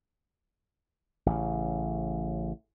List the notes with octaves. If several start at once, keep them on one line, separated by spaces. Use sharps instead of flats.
A1 C#3